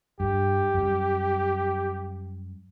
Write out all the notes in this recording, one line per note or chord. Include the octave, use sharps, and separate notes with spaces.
G2 G4
F#2 G3